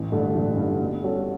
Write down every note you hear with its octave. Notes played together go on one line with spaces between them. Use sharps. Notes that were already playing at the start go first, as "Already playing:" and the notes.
Already playing: A1
G2 D3 A3
A1
G2 D3 A3
B2
G3 C#4 F#4 A4